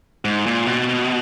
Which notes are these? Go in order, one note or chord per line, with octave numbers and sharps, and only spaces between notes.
G#2
A#2
B2